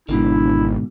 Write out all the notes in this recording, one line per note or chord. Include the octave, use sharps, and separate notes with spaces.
G#1 G#2 B2 D3 D4 E4